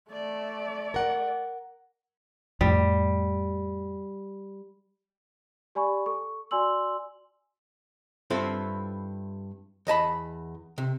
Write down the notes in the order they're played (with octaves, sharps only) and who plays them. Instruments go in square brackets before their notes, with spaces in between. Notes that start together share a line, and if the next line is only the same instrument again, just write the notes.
[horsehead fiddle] A3 D5
[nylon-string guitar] A#4 F#5
[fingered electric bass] F2 A2 [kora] G3
[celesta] G4 D5 G#5 B5 C#6
A4 C#6
F#4 D5 G#5 C6 E6 F#7
[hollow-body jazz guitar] G2 C4 E4 F4 A4
E2 D#5 A5 B5
C3